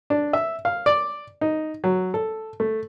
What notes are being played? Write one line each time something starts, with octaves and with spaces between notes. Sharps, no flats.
D4
E5
F5
D5
D#4
F#3
A4
A3